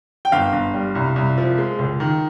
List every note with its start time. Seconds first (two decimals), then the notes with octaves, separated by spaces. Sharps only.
0.25 G5
0.32 G1 F5
0.53 G1
0.74 G3
0.95 C2
1.16 C2
1.38 F3
1.58 G#3
1.79 C#2
2.00 D#3